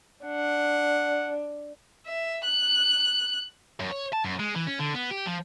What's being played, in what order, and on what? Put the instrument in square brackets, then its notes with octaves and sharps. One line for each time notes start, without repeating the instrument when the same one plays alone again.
[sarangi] D4 [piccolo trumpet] F#5
[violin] E5
F#6
[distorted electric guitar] F#2
C#5
A5
F#2
G#3
E3
C#4
D3
B3
G4
F3